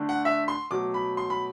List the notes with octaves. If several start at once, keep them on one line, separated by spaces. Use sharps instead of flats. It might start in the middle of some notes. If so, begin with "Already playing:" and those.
Already playing: D3 A3 D4
F#5
E5
C6
B2 F#3 A3 D6
B5
C6
B5